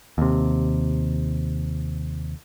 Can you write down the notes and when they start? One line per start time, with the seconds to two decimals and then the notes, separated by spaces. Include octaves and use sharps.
0.18 D#2 C3